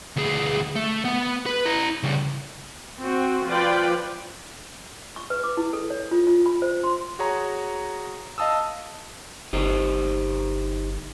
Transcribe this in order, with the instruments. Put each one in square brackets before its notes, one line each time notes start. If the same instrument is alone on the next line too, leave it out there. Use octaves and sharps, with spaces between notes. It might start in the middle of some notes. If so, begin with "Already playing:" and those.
[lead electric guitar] D2 G#4
A3
B3
B4
E4 A#5
C#3 G3
[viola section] C4 F#4
F3 F4 B4 D5 G5
[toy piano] C#6
B4
D6
E4
A4
C#5
F4
F4
B5
C5
C6
[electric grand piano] F#4 G#4 C#5 A#5
D#5 F5 A5 D#6 E6
[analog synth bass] G1 [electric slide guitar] D#4 G4 C5